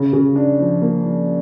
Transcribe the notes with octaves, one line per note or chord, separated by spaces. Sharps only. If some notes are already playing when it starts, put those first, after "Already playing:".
Already playing: C#3
C#3
D4
F3
A#3
F3